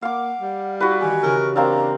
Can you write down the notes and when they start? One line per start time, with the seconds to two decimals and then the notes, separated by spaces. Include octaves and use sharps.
0.02 A#3 F5 F#5 D6
0.41 G3
0.80 E4 F#4 G4 B4 A#5
1.00 D#3 E3 G4 G#5
1.23 C#3 E4 A#4
1.56 A#3 C4 D4 F5 A#5